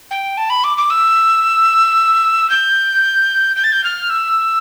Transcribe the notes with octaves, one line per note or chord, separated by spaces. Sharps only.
G5
A5
B5
D6
D6
E6
G6
G6
A6
G6
F6
E6